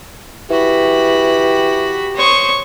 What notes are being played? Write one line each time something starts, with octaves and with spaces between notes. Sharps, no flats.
E3 F#4 G4 B5
C5 C#5 C#6 D#6